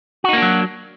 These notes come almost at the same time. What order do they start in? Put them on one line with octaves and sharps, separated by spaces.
F#4 D#4 A#3 D4 F#3